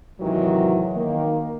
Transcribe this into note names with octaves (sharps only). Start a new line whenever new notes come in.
G#2 C3 D#3 E3 F#3
D#3 A#3